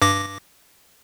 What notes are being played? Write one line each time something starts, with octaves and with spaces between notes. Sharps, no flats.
G2 D6 A#6